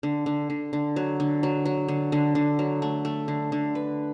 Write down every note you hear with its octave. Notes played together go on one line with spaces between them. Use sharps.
D3
D3
D3
D3
F#3
D3
F#3
F#3
D3
D3
D3
F#3
A3
A3
D3
D3
B4